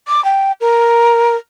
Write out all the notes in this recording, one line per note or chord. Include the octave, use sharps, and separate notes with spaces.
D6
G5
A#4